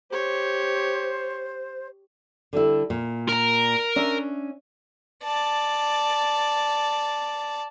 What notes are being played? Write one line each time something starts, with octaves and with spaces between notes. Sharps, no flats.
G4 C5 C#5
D3 G3 E4
A#2
A#4 A#5
C#4 D4 E5
D5 A5